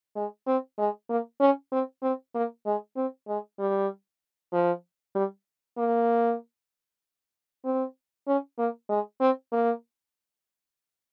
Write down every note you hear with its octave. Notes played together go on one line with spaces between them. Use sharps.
G#3
C4
G#3
A#3
C#4
C4
C4
A#3
G#3
C4
G#3
G3
F3
G3
A#3
C4
C#4
A#3
G#3
C4
A#3